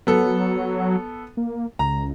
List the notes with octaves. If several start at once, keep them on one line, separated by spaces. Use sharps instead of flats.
F#3 B3 A4
A#3
C#2 A#5